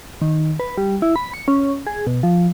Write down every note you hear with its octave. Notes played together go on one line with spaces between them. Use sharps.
D#3
B4
G3
E4
B5
C#7
C#4
G#4
B2
F3